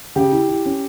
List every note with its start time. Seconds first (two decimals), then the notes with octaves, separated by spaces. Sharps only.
0.16 C#3 G4
0.32 E4
0.49 E4
0.66 C#4